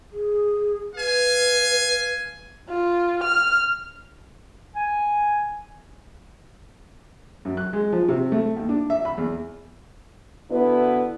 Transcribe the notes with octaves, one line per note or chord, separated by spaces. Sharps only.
G#4
B4 F5 G#5
F4
F6
G#5
F#2
F#6
G#3
F3
C3
A3
D#2
D4
E5
B5
E2
D3 B3 E4 F#4 B4